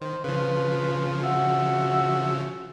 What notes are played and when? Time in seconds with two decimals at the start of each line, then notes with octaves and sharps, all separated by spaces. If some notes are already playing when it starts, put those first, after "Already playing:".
0.01 D#3 C5
0.24 C#3 F3 F4 B4
1.23 F#4 E5 F#5